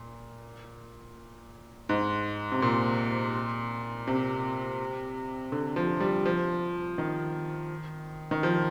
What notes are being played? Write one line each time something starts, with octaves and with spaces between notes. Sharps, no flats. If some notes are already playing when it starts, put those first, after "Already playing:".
Already playing: A#2
G#2
C3
A#2
C3
D3
F3
G3
F3
D#3
D#3
F3